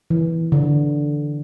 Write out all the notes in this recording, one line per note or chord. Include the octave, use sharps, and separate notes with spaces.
E3
D3